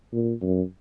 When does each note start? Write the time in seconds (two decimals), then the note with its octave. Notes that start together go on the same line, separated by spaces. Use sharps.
0.13 A#2
0.41 F#2